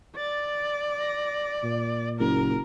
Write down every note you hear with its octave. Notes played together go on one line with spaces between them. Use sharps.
D5 A6
A#6
A#2
F#1 A#4